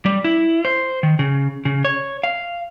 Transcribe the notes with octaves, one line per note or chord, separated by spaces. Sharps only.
G3
E4
C5
D#3
C#3
C#3
C#5
F5